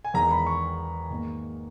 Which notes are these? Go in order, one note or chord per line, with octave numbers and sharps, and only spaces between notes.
G#5
E2 D#3 G#3 A#5
B5
C#6
G#2 D#3 A#3